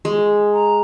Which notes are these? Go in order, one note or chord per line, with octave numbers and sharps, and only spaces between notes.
G#3
A#5